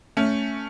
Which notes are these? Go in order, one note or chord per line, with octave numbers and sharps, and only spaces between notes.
A3 C#4